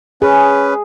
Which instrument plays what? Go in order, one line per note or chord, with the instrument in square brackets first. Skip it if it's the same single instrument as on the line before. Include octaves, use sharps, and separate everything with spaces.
[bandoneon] C#4 B4 [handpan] G#4